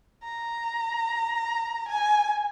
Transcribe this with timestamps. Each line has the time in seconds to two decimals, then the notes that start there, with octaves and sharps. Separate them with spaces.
0.23 A#5
1.88 G#5